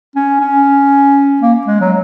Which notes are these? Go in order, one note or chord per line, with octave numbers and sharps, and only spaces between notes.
C#4
C#4
A#3
G#3
F#3